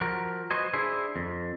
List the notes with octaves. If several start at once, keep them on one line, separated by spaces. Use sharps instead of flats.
F3 F#4 A#4
F#4 B4 C5 D#5 G#5
D4 E4 G#4 C5
F2